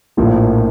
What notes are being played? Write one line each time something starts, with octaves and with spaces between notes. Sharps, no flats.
A#1 A2 F3 A#3